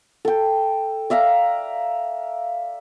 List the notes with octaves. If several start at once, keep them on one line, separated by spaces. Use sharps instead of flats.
A4 G5
D5 E5 F5 A#5